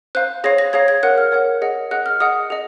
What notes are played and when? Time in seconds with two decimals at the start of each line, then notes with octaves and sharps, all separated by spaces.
0.15 C5 F5 F#6
0.44 G#4 C#5 F5 A#6
0.58 A#6
0.73 G#4 C#5 F5 G#6
0.88 G#6
1.03 A#4 C#5 F#5 F#6
1.18 F6
1.32 A#4 C#5 F#5
1.62 G#4 D#5 F#5
1.91 G#4 D#5 F#5 F#6
2.06 F6
2.20 G#4 D#5 F#5 D#6
2.50 G#4 D#5